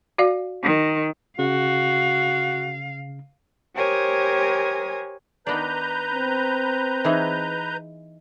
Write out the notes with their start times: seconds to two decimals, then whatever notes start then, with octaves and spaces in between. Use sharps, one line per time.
0.18 F#4 D5 F5
0.63 D#3
1.39 C#3 F#4 F5
3.74 G4 A#4 C5 C#5 G#5 D#6
5.47 D#3 B3 D4 B4 A#5 G6
6.13 C4
7.04 E3 D#4 G#4